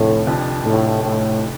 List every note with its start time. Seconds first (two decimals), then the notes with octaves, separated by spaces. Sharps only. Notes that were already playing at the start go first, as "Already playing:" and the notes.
Already playing: F1 F2 A2 D3
0.27 F1 F2 F3 D4
0.64 A2
1.02 A2